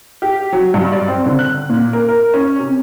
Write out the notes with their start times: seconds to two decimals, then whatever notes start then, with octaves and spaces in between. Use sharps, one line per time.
0.22 G4
0.53 F#3
0.74 G2
0.92 D5
1.08 C4
1.26 D3
1.39 F#6
1.70 A#2
1.93 A#4
2.09 A#4
2.34 C#4
2.59 C3